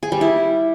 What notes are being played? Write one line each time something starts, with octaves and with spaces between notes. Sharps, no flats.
G#4
G3
E4